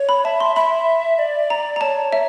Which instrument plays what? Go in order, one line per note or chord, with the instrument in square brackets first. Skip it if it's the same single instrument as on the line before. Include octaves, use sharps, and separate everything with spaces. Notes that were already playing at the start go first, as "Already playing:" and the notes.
Already playing: [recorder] C#5
[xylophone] B5
[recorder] E5 [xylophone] A5
[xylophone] C6
[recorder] E5 [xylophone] B5
[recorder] D5
[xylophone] A#5
A#5
[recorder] C#5 [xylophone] A5
[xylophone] E5